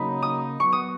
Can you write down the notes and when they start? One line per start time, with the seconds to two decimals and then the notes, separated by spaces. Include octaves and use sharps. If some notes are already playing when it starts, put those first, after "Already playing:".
Already playing: C#3 F#3 A#3 D#4 B5
0.22 D#6
0.60 F#3 B3 F#4 C#6
0.73 D#6